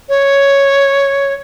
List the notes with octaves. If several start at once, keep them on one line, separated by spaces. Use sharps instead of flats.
C#5